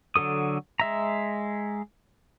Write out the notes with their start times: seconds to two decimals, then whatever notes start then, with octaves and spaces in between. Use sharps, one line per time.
0.16 D3 F#3 A4 D#6
0.80 G#3 E5 A#5